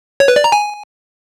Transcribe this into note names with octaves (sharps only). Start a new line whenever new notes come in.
C#5
B4
D5
A#5
G#5